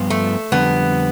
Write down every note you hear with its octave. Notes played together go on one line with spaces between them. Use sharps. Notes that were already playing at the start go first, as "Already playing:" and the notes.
Already playing: G2 F3 B3 F4
A3
F2 D3 G3 B3